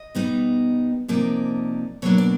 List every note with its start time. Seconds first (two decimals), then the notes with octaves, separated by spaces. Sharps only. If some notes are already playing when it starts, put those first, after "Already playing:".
Already playing: D#5
0.15 B2 G3 B3 D#4
1.08 C3 F3 A#3 D#4 D5
2.02 B2 F#3 A#3 D4 C#5
2.18 D5